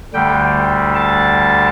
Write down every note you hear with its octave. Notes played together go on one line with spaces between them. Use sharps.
D2 D3 G3 G5
A5